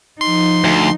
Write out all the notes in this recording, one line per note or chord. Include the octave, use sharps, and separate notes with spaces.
F3 D#4 C6
D2